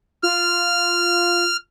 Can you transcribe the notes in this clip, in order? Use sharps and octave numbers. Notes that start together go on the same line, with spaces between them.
F4 F6